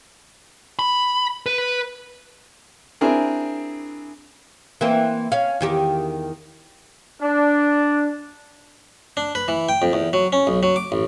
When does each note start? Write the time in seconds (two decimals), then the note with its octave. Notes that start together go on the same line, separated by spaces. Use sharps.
0.79 B5
1.46 B4
3.01 C4 D4 E4 G#4 A#4
4.81 E3 A#3 C4
5.32 C#4 F5
5.61 E2 D#3 G4
7.22 D4
9.17 D4
9.35 B4
9.48 E3
9.69 G5
9.82 F2
9.93 E2
10.13 F#3
10.33 C#4
10.47 B1
10.63 F#3
10.76 D6
10.92 A1